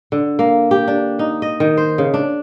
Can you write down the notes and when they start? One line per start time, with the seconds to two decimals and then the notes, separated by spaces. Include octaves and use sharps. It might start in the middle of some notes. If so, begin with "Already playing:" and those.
0.12 D3
0.39 A#3
0.71 G4
0.88 D4
1.19 D#4
1.42 D#5
1.60 D#3
1.77 C5
1.98 C#3
2.14 D4